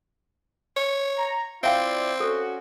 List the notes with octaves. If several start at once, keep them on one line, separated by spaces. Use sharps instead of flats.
C#5
A#5
C4 E4 F4 D5 E5 F5 G5
C#4 F#4 A4